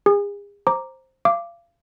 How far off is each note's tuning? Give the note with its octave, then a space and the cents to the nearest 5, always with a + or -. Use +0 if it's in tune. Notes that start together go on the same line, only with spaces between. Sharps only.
G#4 -40 G#5 -25
C5 +10 A#5 +0 D6 +0
F5 -30 D6 +0